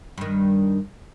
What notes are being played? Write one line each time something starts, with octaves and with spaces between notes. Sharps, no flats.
G2 D#3